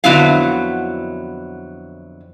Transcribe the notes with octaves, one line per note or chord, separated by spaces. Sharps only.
F2 D3 F#3 B3 E4 F5